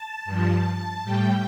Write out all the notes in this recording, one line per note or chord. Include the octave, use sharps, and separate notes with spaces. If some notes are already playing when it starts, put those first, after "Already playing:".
Already playing: A5
G2 F3
A2 G3 G5